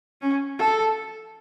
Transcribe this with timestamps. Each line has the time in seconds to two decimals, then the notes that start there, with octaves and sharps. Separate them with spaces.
0.22 C#4
0.59 A4